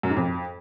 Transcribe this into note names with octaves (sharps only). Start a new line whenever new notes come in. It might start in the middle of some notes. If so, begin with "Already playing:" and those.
F#2
G#2
F2